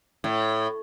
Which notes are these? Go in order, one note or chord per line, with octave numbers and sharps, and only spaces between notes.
A2